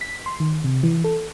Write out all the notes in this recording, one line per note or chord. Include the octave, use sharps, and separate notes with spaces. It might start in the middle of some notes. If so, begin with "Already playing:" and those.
B6
C6
D#3
C3
E3
A4